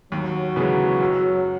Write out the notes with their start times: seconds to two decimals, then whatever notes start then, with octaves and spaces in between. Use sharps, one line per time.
0.12 D#2 F#3
0.56 C#3 E3 G#3 B3
1.00 F#2